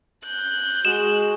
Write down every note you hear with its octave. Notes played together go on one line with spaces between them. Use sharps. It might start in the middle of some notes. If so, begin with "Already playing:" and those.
F#6 G6
G#3 F#4 E7